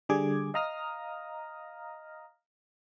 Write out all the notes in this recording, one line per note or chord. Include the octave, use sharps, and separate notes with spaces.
D3 G3 G#4 D6 G#6
D#5 F5 A#5 D#6 F6 A#6